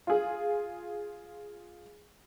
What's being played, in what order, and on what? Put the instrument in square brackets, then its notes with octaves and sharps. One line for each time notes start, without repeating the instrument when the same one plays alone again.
[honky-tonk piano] F4 G#4